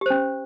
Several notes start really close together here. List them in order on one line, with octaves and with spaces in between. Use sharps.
G4 C5 C#4